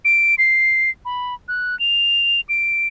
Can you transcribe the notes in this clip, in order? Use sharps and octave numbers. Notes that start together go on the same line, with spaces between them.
D7
C7
B5
F#6
F7
D7